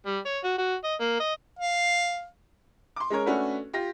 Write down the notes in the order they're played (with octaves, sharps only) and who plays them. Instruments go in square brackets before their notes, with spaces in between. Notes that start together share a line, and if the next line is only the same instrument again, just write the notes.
[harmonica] G3
C#5
F#4
F#4
D#5
A#3
D#5
F5
[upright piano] C6 D6
G#3 C#4 A#4 C#5
A3 C#4 D4 F#4 B4
F4 G4 A#6